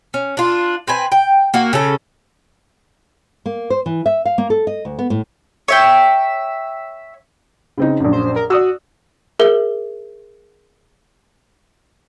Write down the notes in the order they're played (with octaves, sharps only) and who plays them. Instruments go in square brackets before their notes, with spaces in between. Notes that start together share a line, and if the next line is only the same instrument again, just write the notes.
[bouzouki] C#4
D4 F4
C4 B4 G#5
G5
A#3 F#4
C#3 C#4 A4
[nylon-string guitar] A#3
C5
E3
E5
F5
A#3
A4
D#5
D2
B3
A2
[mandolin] C#5 E5 G5
[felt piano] C#3 C4 D#4
A#1 F#2
[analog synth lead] C5
A#4
[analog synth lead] F#4 [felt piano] D5 D#6 E6
[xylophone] G#4 A#4 E5 G7